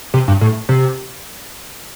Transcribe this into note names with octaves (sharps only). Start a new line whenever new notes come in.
C3
G2
A2
C3